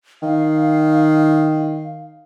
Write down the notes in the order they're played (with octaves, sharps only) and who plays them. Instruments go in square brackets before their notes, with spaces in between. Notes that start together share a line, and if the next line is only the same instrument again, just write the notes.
[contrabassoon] D#3 [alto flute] F5